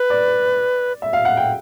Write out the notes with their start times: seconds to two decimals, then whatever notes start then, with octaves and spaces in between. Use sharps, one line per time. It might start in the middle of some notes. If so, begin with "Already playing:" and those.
Already playing: B4
0.10 D5
1.02 E5
1.13 F5
1.25 F#5
1.37 G5